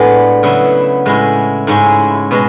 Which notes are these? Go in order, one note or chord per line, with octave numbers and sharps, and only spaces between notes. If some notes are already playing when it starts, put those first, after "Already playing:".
Already playing: A2 G#3 B3 D4
C#3 F#3 B3 E4
A2 G#3 C#4 E4
G#2 G#3 C#4 E4
B2 G#3